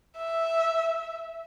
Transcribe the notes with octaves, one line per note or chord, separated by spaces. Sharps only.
E5